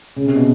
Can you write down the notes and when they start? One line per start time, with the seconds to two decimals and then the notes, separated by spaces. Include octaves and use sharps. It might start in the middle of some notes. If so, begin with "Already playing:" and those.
0.16 C#3
0.26 C3
0.36 B2